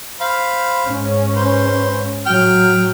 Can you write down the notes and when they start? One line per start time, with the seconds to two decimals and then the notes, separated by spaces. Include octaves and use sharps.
0.20 C5 F5 B5
0.85 G#2 C#4
1.35 B4 C5
2.26 A2 F#3 G5 F6